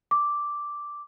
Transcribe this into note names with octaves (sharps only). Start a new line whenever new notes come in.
D6